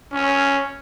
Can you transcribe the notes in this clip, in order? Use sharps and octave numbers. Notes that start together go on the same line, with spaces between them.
C#4